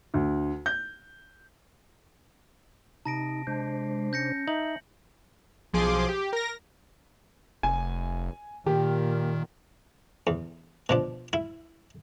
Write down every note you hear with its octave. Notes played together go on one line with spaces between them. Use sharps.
D2
G6
C3 D#4 A5 A#6 D7
C3 G#3 D4 C5
C#4 G6 A#6 C#7
D#4 E5 F#7
B1 F3 G#4 C6 D6
G4
A#4 A#6
F1 G#5
A#2 D#3 G4
E2
B2 F3 D4
E4